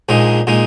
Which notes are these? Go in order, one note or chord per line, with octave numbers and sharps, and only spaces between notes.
A#1 A#2 G#3 D#4
A#2 G#3 D#4